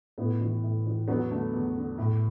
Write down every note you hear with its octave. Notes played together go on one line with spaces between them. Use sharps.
A2 B3 E4
E3
A2
E3
E2 F#3 B3
D3 A3
E2
D3
A2